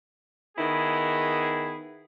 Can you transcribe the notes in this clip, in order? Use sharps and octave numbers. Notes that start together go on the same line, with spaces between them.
D#3 B3 E4 G#4